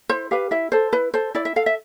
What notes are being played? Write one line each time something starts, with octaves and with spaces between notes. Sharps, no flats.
E4 C5
G4 B4 F5
E4 E5
A4 C5
E4 B4
A4 C5
E4 D5
E5
A4 F5
E5